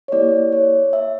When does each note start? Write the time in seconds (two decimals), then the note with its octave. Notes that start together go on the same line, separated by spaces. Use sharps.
0.08 C#5
0.12 A#3 E4 G4 D5
0.52 C#5
0.93 E5